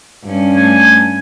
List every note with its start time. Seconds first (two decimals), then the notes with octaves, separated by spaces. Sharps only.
0.24 G2 C#4
0.57 A3 G#5